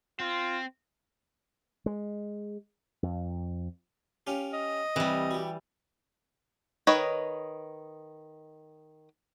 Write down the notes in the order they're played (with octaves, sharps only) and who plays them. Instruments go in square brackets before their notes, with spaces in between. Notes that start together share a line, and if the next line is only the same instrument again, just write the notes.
[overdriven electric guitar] C4 [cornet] F4
[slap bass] G#3
F2
[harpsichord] C#4 F4 G4
[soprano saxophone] D#5
[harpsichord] C2 [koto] E3 G3
[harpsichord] F#4 G4
[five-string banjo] D#3 B4 C#5 D#5